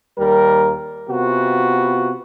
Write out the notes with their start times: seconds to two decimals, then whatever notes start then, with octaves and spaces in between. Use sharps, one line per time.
0.19 D#2 G3 A#4
1.09 C3 B3 F4 F#4